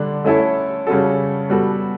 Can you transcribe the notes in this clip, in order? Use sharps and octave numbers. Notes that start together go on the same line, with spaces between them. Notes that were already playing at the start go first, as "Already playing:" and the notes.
Already playing: D3 G3 D4
A3 C#4 E4 A4
C#3 G3 C#4 F#4 A4
G3 B3 F#4 A4